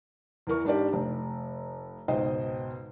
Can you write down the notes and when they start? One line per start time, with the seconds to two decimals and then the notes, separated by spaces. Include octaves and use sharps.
0.47 E2 E3 A#4 C#6
0.65 G#2 D4 G4 D5
0.93 F1
2.08 C#2 G#2 B2 C5 D#5 G5